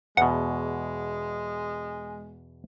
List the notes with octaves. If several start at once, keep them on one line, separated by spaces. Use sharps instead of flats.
E2 B2 G#3 F#5